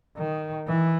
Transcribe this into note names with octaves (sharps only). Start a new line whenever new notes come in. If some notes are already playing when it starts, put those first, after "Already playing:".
D#3
E3